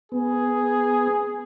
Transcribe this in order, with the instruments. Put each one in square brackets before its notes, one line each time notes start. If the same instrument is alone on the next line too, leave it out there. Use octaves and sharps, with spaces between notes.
[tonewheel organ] B3 [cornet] G#4